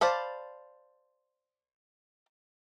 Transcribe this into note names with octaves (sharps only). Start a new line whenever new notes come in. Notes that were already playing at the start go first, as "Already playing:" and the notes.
C5 D5 F5 A5 B5